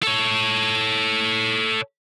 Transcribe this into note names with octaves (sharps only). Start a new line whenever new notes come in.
A4 C#5